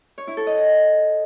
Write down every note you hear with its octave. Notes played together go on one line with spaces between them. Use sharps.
C#5
E4
A4
D#5